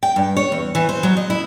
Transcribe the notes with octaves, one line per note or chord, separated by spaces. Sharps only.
G5
G2
C#5
E2
E3
C5
F#3
D#5
E4